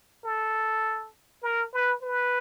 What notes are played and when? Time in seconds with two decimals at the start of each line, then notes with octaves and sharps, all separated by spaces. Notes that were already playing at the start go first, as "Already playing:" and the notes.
0.24 A4
1.43 A#4
1.73 B4
2.03 B4